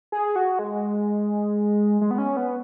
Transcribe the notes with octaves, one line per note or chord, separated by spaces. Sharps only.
G#4
F#4
G#3
G#3
B3
C#4
B3